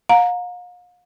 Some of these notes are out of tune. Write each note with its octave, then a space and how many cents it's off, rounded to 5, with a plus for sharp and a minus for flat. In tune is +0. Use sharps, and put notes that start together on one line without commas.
F5 +40 A#5 +0